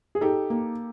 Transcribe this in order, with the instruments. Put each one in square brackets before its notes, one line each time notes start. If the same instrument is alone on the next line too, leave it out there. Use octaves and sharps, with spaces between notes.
[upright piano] G#4
[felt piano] D#4 [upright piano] G4 A4
[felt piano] A#3